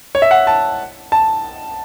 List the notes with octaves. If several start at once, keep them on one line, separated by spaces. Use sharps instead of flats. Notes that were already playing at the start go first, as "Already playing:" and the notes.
C#5
E5
F#5
A5
A5